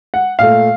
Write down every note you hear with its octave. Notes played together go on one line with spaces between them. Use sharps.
F#5
A#2 A3 F5